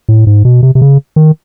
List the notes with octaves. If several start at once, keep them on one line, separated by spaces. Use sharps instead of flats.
A2
G#2
B2
C3
C3
C#3
D#3